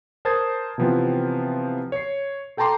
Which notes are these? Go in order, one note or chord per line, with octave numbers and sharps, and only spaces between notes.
A#4 C5 A5 D#6 G#6 A6
C3 E3 F3 B3 C4 F4
C#5 C7
A4 G5 A5 A#5 C6 D6